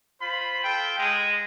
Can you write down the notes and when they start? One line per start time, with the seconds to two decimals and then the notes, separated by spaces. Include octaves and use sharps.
0.20 F4 C5 B5
0.63 F4 A4 G5
0.97 G#3